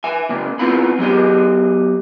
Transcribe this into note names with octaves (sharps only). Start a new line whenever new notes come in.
E5 G#5
C#3 A#3
B3 C4 E4 F4 B5
F#3 B3 G4 D#5